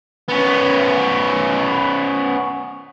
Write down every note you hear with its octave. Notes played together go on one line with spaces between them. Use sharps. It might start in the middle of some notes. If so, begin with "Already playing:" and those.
B3 C#4